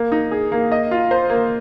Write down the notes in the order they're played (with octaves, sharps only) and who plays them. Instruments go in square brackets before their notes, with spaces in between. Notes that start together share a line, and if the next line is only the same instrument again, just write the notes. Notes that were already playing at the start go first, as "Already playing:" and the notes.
Already playing: [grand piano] A#3
D#4
G#4
A#3
D#5
F4
C5
A#3